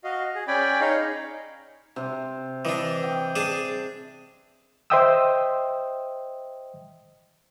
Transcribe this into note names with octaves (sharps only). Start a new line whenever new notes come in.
F#4 D#5 F5
G#4
C#4 D5 G5 G#5 B5
D#4 G#4 C#5 D#5 F5
C3 C5
E3 D4 D#5
G5
D4 G#4 A5
C5 D#5 E5 G5 D#6 E6